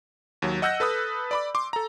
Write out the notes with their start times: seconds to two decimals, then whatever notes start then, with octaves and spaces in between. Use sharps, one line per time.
0.42 D#2 F#3
0.62 D#5 F#5 E6 F#6 G6 A#6
0.80 A4 B4 B5 D#6
1.31 D5 B5 D6
1.55 C6 D6
1.73 A4 A#5